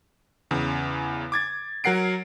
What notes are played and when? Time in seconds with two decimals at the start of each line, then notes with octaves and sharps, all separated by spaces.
0.51 E2 C#3
1.32 D6 G#6 A6
1.84 F#3 A#4 F#5 C7 D7